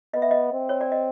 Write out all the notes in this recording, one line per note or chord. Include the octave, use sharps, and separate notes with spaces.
B3 D#5
E5
D#5
C4
C#5
D5
D#5